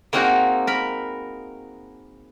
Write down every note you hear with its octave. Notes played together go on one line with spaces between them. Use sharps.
A#3 C4 D#4 F#4 G#4 F5
A#4 B5